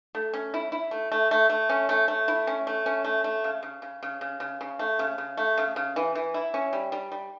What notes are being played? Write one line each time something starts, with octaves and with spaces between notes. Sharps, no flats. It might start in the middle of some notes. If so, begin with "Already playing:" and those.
A3
C#4
E4
E4
A3
A3
A3
A3
C#4
A3
A3
E4
C#4
A3
C#4
A3
A3
C#3
C#3
C#3
C#3
C#3
C#3
C#3
A3
C#3
C#3
A3
C#3
C#3
E3
E3
E4
C#4
G3
G3
G3